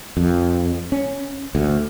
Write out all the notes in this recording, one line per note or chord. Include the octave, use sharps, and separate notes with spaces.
F2
C#4
D2